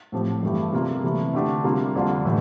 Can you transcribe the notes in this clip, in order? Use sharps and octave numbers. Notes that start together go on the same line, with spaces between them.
A2 F3 C4 G4
G2 E3 A3 E4 G4
C3 G3 A#3 F4
C3 E3 A3 E4
D3 A3 D4 G4
C3 G3 A#3 F4
F2 D3 G3 D4 F4
A2 E3